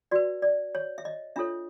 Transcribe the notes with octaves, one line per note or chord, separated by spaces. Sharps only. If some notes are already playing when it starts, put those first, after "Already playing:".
F#4 B4 D5
D5
C#5
E5
D#5
D4 F4 A4 C#5 E5